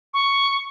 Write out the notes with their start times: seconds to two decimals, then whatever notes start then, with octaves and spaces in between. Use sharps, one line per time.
0.14 C#6